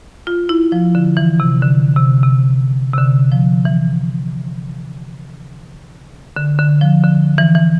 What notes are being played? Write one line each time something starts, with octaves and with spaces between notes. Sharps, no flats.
F4
E4
F3
D3
E3
C3
D3
C3
C3
C3
D3
F3
E3
D3
D3
F3
D3
E3
E3